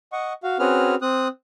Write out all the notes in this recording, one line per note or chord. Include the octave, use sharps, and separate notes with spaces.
D#5 F#5 C#6
F#4 F5
C4 C#4 F#4 G#4 B4 F6
C4 D#6 F#6